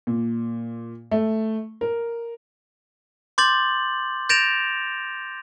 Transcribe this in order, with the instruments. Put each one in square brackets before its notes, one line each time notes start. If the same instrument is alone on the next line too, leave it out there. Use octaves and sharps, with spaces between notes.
[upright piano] A#2
A3
A#4
[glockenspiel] C6 D6 G6 A6 F#7
G6 A6 A#6 D7 E7 F7